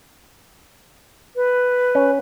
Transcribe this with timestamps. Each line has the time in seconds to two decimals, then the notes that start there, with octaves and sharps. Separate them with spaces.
1.36 B4
1.95 C#4